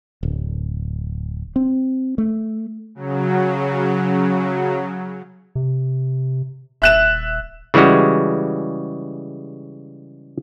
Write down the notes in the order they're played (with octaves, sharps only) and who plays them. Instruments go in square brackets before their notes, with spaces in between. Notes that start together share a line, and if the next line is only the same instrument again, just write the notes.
[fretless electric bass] D1
C4
A3
[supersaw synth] C#3 F#3
[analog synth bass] C3
[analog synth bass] D#1 [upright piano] E5 F#6 E7
[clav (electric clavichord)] C#3 E3 G3 G#3 F#4